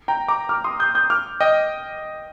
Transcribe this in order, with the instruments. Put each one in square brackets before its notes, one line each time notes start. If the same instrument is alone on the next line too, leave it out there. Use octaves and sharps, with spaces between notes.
[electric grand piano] G5 A#5
A#5 D6
D6 F6
C6 D#6
D#6 G6
D#6 G6
D6 F6
D#5 G5